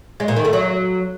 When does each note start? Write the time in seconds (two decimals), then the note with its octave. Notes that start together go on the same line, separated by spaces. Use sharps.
0.20 G#3
0.28 A#2
0.36 D#3
0.45 A3
0.53 F#3